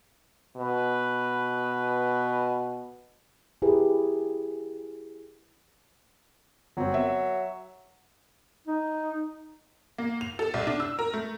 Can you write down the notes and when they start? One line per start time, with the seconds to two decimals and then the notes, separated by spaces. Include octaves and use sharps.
0.57 B2 B4
3.62 E4 G4 G#4 A#4 B4
6.77 G1 F#3 C4
6.93 A#4 E5
8.67 D#4
9.98 A#3
10.21 F7
10.39 A4
10.54 C2
10.67 D4
10.80 E6
10.99 A#4
11.14 A3